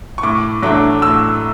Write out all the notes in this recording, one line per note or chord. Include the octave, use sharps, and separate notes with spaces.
C#6
A2 D6
F#3 A3 D4 D6
A2 E6